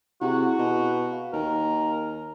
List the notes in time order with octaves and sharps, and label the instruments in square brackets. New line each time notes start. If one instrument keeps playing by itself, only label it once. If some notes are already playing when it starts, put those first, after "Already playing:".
[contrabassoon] C3 [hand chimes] E4 G#4 [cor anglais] F#4
[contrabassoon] B2
[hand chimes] F5
[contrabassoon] D#2 [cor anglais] A#4